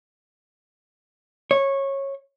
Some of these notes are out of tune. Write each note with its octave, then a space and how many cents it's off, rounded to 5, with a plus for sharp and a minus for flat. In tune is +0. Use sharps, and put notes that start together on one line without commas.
C#5 -15